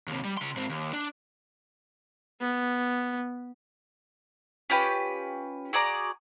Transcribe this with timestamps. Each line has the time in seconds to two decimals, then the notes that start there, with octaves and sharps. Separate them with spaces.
0.08 D#2 C3
0.25 G3
0.37 C#3 C6
0.56 G#2 C4
0.69 D#2
0.93 D4
2.40 B3
4.70 C#4 F4 G4 B4
5.73 F#4 G#4 D5 A#5